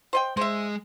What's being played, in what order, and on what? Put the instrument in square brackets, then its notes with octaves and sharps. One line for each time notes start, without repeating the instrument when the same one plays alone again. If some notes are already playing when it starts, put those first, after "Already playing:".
[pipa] C5 D#5 G5
[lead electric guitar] G#3 [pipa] C5 E5